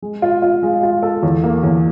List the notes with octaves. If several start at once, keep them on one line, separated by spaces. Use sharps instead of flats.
G#3
F4
F4
G#3
F4
A4
E2
A#3
E2